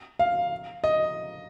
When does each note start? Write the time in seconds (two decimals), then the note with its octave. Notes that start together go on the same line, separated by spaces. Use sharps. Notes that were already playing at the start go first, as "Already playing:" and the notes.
0.19 F5
0.84 D#5